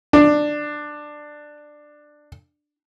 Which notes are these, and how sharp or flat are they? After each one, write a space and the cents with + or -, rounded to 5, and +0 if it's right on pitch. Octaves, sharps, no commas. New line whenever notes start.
D4 +15